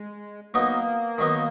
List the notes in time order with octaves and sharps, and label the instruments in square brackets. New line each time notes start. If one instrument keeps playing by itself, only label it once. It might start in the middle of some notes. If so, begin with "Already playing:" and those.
Already playing: [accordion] G#3
[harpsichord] F#3 B3 D#4 [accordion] A#3
[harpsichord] D#3 F#3 B3 D#4